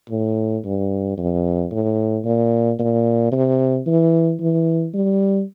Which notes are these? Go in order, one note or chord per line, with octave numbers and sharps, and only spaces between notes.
A2
G2
F2
A2
A#2
A#2
C3
E3
E3
G3